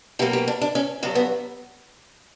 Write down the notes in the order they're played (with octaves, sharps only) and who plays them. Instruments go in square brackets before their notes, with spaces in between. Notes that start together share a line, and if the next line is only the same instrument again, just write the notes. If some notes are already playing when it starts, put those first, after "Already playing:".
[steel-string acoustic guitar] B2 F#3 A#3 G4
G4
D4
D4
C#4
G2 D3 F#3 B3
B3